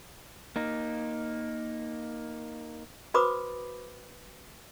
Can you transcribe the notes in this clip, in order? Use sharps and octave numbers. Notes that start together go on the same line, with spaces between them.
A#3 D#4
F#4 B4 C5 B5 D6 D#6